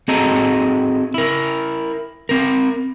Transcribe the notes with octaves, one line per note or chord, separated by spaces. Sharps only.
C4 F#4 G#4 A4 D#5 A#5
E4 A#4
C4 A#4